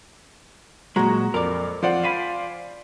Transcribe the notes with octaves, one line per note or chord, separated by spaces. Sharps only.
A#2 F#3 G#3 F#4 A#5
F2 A#4 D5
F2 F4 C5 D5 F#5
F5 G#5 B5